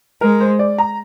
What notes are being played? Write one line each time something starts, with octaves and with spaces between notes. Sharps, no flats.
G#3 A#4
C5
D5
A#5